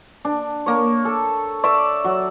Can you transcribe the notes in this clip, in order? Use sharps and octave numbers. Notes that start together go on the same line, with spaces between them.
D4
A#3 C#5
A4
D5 E5 C#6 D6
F#3